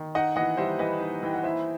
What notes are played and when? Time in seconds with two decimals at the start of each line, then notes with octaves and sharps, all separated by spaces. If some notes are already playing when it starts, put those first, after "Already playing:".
Already playing: D#3
0.15 D#4 D#5 F#5
0.36 E3 D#5 F#5
0.57 G3 C5 E5
0.79 E3 B4 D#5
1.00 D#4
1.23 E3 G5
1.34 F#5
1.43 E4 C5 E5